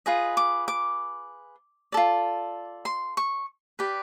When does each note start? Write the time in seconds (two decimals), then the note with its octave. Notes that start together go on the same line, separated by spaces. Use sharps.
0.06 F4 G#4 B4 D#5
0.37 D6
0.68 D6
1.92 F4 A4 D5
2.85 C6
3.17 C#6
3.79 G4 B4 D5